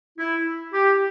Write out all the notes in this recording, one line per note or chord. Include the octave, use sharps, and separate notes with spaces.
E4
G4